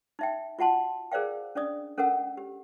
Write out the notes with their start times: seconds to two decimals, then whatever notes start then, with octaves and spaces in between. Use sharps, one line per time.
0.19 D#4 E5 G5
0.59 F4 F#4 F#5 A5 C6
1.12 G#4 A#4 C5 D5 F5 G5
1.55 C#4 D4 D5 D#6
1.98 C#4 A4 A#4 F#5 E6
2.37 G4